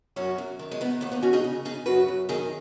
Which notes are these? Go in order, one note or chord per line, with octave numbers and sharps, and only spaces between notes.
F#2 C#4 F#4
F#2
D#3
G#3
D#3 B3
D#2 B3
B3 D#4
D#2 C#4 F#4
D#4 G#4
C#3
C#3 D#4 G#4
F#2 F#4 B4
F#2
D#3 D#4 G#4